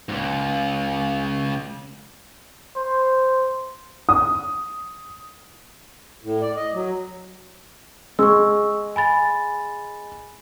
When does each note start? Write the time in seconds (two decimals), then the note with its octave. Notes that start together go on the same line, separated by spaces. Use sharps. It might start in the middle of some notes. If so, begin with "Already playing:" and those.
0.09 C#2 G#2
2.76 C5
4.09 D#6
6.24 A2
6.42 D5
6.56 D#5
6.74 F#3
8.19 G#3 C#6 E6
8.96 G#5 B5 A6